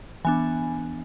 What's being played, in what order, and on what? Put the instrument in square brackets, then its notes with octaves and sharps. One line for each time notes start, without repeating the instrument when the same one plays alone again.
[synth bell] E3 B3 D4 G#5